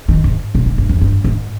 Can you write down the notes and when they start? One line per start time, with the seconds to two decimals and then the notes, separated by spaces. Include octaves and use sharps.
0.08 D#3
0.24 G#2
0.55 A#2
0.66 G#2
0.78 G2
0.89 E2
1.01 G2
1.24 G#2